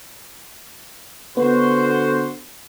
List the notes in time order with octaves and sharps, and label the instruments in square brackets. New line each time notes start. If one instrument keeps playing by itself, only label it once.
[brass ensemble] D3 F#4 C5 [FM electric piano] B3